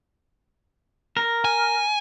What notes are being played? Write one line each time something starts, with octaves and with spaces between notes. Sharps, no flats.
A#4
G#5